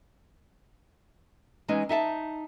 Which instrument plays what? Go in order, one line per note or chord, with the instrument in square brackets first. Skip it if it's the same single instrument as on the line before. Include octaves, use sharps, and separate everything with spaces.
[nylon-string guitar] E3 G#3 C#4 D#4
D#4 E5 F#5 A5